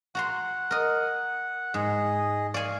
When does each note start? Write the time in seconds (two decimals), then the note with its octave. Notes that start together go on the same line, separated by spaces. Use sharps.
0.15 F#4 F#5 A#5 C6
0.71 A#4 D#5
1.74 G#2 G#4 D#5
2.54 D5 F5 G#5 C#6